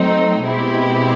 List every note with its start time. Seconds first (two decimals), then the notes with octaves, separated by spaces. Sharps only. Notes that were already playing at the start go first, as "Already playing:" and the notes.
Already playing: F#3 A3 C4 D#4
0.45 B2 G#3 C4 E4 G4